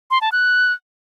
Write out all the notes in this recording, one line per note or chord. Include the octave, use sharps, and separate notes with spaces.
C6
A5
F#6